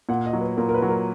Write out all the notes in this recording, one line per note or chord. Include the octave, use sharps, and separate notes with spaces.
A#2 F#5
D#5
F#3
B4
A#2 A#4
A#4
B4
F#3
A#4